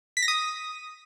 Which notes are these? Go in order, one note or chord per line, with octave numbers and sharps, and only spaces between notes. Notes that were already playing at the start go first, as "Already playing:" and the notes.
B6
A#6
D#6